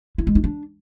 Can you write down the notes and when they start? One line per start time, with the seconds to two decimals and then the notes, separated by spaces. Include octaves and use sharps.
0.18 E4
0.27 G#3
0.35 D#4
0.44 D4